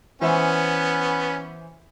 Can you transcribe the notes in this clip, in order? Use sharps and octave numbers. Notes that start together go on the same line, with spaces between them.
E3 B3 C#4 C5 E5